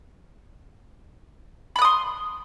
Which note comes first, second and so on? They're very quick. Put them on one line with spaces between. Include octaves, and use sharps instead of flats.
B5 F#6 D#6 C6